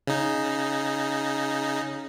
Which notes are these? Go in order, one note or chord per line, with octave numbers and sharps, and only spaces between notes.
C#3 D#4